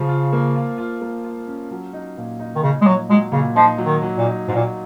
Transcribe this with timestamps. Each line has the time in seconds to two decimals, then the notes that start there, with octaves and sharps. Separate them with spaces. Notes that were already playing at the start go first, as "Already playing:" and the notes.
Already playing: C#3 F3
0.09 F4
0.33 A#3
0.56 F4
0.78 F4
1.01 A#3
1.24 F4
1.47 C#4
1.71 F#3
1.93 D#4
2.18 A#2
2.40 D#4
2.55 D#3
2.63 C#3 D#4
2.81 G#3
2.86 A#2 F#3
3.09 F#3 G#3
3.32 A#2 C#3
3.56 F3 D#4
3.78 F#3
3.86 D#3
4.02 F#3
4.17 A#2
4.25 D#4
4.48 G#2 F#3
4.54 A#2